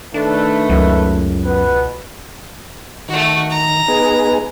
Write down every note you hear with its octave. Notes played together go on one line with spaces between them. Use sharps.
D#3 A3 D4 B4
C#2 F#2
B2 B3 B4
D#3 A3 F#4
A#5
B3 D#4 G#4